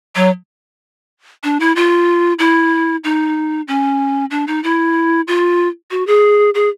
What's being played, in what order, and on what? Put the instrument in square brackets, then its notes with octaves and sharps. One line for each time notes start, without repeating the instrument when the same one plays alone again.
[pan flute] F#3
D4
E4
F4
E4
D#4
C#4
D4
D#4
E4
F4
F#4
G#4
G#4